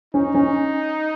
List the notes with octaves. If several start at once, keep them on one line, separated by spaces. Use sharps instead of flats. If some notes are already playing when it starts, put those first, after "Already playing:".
C#4 D#4
C#4